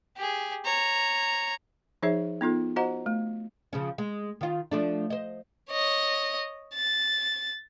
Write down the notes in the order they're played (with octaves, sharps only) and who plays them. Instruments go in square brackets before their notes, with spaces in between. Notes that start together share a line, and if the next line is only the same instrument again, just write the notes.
[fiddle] G4 G#4
C#5 A#5
[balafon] F3 D#4 G#4 C#5 E5
B3 D#4 F4 A4
F#4 C5 D#5 F#5 A#5
A3
[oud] C#3 F3 C#4
G#3
D#3 F4
F3 A3 D4
C5 D#5
[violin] C#5 D#5
A6